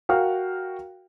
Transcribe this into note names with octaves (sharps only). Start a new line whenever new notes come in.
F#4 A#4 F5 G5 F6